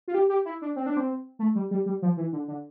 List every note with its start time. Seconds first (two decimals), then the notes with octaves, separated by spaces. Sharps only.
0.08 F4
0.14 G4
0.29 G4
0.45 E4
0.62 D4
0.76 C4
0.86 D4
0.97 C4
1.39 A3
1.55 G3
1.71 G3
1.86 G3
2.02 F3
2.17 E3
2.32 D3
2.48 D3